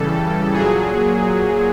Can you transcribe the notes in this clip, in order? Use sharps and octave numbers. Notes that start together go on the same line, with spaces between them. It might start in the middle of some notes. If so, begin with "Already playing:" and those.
Already playing: C#3 E3 G3 A4
A#2 F#3 G#4